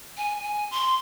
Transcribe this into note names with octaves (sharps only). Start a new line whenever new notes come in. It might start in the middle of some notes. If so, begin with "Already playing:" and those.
G#5
G#5
C6